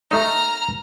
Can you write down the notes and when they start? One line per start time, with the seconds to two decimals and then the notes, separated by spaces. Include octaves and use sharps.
0.11 A3 D#4 A#5 F6